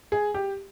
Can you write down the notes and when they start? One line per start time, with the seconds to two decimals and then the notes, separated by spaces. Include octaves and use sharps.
0.12 G#4
0.34 G4